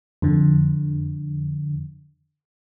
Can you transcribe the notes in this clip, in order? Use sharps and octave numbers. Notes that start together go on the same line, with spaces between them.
F2 D3